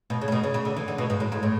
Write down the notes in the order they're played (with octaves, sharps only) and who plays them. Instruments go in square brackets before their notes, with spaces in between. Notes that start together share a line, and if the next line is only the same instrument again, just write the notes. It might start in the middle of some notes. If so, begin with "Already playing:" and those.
[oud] B2
C#3
A2
B2
C#3
C#3
D3
E3
D3
B2
G#2
A2
G#2
A2